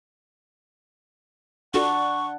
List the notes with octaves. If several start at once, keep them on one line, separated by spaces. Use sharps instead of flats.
D4 F4 F#4 A4 F#5 C#6